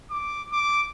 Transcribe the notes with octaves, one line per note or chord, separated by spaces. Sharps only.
D6
D6